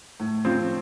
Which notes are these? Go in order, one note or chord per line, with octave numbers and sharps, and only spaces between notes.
A2
F3 C4